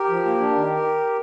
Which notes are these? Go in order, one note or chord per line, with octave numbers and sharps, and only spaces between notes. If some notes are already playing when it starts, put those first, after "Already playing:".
Already playing: G4 A#4
F3
A#3
D4
D#3